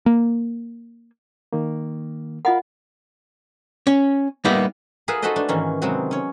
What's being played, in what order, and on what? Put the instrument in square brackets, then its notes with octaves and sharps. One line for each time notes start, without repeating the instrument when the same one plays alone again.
[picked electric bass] A#3
[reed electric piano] D#3 A#3
[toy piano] F4 D#5 F#5 [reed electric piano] A#4 F5 B5
[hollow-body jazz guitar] C#4
G3 A#3 B3 D#4 E5
[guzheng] F4 G#4 A#4 B4 E5 F#5
D#4 F#4 A4 B4 C5 D#5
A3 D4
G#2 D#3 E3 A#3 C#4
C3 F#3 G#3 B3 C4 F#4
C#4 C#5